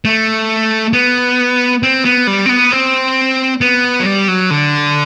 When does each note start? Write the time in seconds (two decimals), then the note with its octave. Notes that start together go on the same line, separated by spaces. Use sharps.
0.05 A3
0.93 B3
1.83 C4
2.05 B3
2.27 G3
2.46 C4
2.49 B3
2.72 C4
3.61 B3
4.00 F#3
4.06 G3
4.28 F#3
4.51 D3